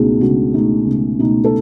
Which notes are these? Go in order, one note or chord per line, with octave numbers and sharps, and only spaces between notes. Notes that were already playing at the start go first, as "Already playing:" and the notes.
Already playing: C#2 B2 A3 D#4 F#4 G#4
C#2 F#4
B2 A3 D#4
C#2
B2 A3 D#4
A4